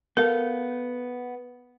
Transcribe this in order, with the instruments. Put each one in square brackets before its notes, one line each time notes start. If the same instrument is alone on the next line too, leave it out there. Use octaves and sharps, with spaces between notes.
[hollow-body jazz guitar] B3 A4 F5 [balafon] A#4